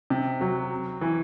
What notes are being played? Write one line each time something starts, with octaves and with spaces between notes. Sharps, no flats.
C3
F#3
E3